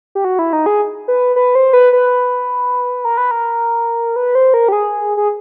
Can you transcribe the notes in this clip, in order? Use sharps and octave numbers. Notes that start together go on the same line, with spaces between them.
G4
F#4
E4
D#4
G#4
B4
B4
C5
B4
B4
A#4
B4
A#4
B4
C5
A#4
G4
G#4
G#4